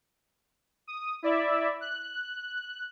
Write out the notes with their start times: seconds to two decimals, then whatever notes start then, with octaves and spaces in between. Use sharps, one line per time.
0.87 D#6
1.23 E4 D5 E5
1.81 F#6